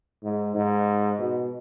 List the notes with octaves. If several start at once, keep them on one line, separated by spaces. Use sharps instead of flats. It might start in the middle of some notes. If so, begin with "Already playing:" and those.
G#2
G#2
B2